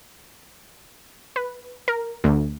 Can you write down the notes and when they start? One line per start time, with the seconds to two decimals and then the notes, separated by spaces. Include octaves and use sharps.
1.36 B4
1.88 A#4
2.24 D2